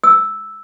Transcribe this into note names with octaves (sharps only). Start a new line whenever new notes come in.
E6